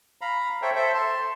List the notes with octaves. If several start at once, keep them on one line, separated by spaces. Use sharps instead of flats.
F5 A#5 B5
A4 C5 C#5 E5 G5
A4 C5 E5
A5 C6